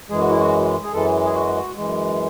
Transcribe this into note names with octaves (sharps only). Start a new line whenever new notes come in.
F#2 E3 G#3 G#4
F#4
E4
F#4
G#4
F#2 E3 G#3 A4
G#4
F#4
F#2 E3 G#3